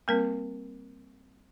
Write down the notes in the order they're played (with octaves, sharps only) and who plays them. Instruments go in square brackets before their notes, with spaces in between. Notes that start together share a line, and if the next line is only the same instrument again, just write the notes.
[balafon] G3 A#3 C4 A#4